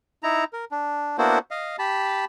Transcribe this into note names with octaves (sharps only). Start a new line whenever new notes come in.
D#4 E4 A#5
A#4
D4
A#3 B3 D4 E4 F#4 C5
D#5 F5
G4 A5 B5